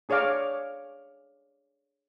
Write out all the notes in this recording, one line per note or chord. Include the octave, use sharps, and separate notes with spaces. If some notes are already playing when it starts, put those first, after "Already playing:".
D4 G#4 C#5 D5 F5 D6